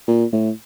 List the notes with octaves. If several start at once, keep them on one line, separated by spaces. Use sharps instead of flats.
A#2
A2